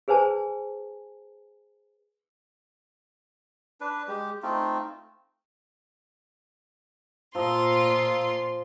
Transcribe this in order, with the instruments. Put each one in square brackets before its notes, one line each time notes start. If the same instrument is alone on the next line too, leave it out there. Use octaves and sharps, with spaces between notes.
[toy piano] G#4 B4 C5 G#5 A5
[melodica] D4 B4
G#3 G4
A3 C4 D#4 F4
[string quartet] A#2 F4 C6 [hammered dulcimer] F3 D#5 [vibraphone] F5 A#5 E6